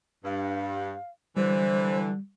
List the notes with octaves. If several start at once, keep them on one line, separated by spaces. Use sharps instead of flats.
G2 F5
D3 E3 G3 C5